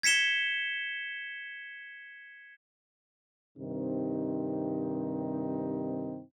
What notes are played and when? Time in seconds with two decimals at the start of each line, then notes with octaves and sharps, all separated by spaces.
0.03 G#6 B6 C#7 E7 G7
3.58 G2 C3 D#3 C4 D#4